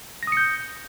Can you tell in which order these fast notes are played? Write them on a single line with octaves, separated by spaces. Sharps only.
A#6 D#6 C#7 G6